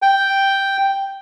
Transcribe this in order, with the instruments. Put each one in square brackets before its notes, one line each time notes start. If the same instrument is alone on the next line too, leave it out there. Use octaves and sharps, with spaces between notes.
[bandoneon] G5